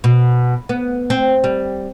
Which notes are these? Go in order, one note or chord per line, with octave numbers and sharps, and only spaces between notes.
B2
B3
C4
G3